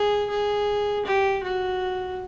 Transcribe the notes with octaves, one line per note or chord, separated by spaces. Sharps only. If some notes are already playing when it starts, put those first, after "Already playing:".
Already playing: G#4
G#4
G4
F#4